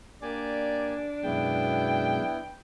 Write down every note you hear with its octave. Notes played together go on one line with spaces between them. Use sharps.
A#3 D4 G4 D5 G#5
F#2 B2 G#3 B3 E4 G5